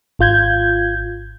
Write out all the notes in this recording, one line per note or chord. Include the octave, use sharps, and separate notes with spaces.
G#1 F4 G6 G#6